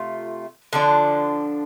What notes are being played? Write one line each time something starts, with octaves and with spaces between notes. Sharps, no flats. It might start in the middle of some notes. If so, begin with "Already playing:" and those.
Already playing: C3 A3 F4
D3 F3 D4